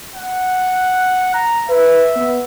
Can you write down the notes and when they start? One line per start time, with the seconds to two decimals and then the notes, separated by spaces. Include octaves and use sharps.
0.15 F#5
1.34 A#5
1.70 B4 E5
2.16 B3